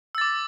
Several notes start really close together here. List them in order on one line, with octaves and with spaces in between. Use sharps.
E6 A6 D6